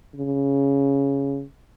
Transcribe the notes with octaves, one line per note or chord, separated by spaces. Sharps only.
C#3